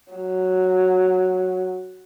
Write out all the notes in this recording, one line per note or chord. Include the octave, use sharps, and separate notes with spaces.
F#3